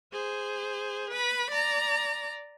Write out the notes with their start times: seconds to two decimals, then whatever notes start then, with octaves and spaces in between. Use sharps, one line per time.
0.13 G#4 C5
1.10 B4 B5
1.50 D5 A#5